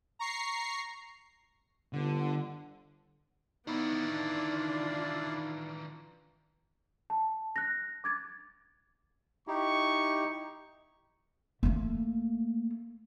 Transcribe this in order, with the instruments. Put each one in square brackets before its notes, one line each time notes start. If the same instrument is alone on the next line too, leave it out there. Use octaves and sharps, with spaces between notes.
[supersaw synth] A#5 C#6 C7
[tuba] G1 [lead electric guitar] D3
[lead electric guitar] D#3 E3 [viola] B3 [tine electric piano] D#4 [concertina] E4 D5 F5
[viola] D4 F4
[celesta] A5
F#6 A#6
D6 G#6 A6
[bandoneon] D#4 E4 G4 [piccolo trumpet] C#6
[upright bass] A3 A#3